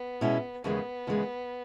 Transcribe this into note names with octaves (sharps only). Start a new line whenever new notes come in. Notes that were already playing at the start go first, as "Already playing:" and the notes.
Already playing: B3
B2 G#3 C#4 E4
D#2 C#3 E3 G#3 B3
D#2 C#3 E3 G#3